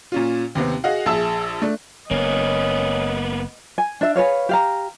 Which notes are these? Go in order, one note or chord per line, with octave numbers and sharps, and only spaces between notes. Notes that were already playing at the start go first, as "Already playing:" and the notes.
A#2 C#4 F4
D#2 C3 B3 C4
F#4 G#4 D#5 F5 F#5
A#1 G#4 E5 A5 E6
A3 D4
F#1 A#3 B3 C#4 D#5
G#5
D4 E5
G#4 B4 C#5 F5
G4 F5 A#5